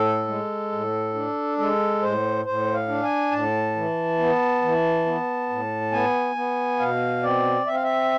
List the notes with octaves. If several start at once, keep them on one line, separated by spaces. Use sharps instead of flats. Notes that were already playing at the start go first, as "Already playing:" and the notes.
Already playing: A2 A4
G#3
A2
D4
G#3 A4
A2 C5
A2 C5
F5
D4
G#5
A2 A5
E3
B3
E3
B3
A2
B3 G#5
B3
B2 F5
C4 D5
C4 E5
F5
E5